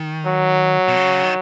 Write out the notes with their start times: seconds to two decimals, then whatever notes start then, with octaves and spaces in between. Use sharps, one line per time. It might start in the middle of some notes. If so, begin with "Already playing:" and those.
Already playing: D#3
0.26 F#3
0.88 B2
0.96 C#3
1.24 D#3